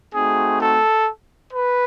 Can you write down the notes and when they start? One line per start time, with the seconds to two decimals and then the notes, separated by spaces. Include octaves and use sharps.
0.13 A3 C4 D#4 F#4 G#4
0.59 A4
1.54 B4